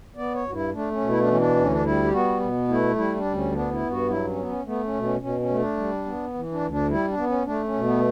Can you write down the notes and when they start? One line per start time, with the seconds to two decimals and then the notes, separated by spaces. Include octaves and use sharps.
0.16 B3 D5
0.34 C#5
0.44 G2 F#4
0.53 E4
0.72 A3 D4
0.91 C#4
1.01 B2
1.09 E4
1.19 D4
1.28 E3 C#4
1.38 D4
1.56 D2 C#4
1.71 D4
1.84 G3 E4
2.03 G4
2.12 B3 F#4
2.40 B2
2.68 A3 E4
2.96 G3 E4
3.16 D4
3.25 D2
3.34 C#4
3.52 B3 D4
3.71 E4
3.81 G2
3.90 F#4
4.09 F#3 E4
4.27 C#4
4.36 B3
4.46 C#4
4.65 A3 B3
4.83 C#4
4.94 B2
5.03 C#4
5.21 B2 C#4
5.40 C#4
5.50 A3
5.58 D4
5.77 G3
6.06 B3
6.34 E3
6.52 D4
6.61 D2
6.70 D4
6.89 G3 E4
7.08 D4
7.17 B3
7.27 C#4
7.45 A3 D4
7.64 C#4
7.74 B2
7.84 B3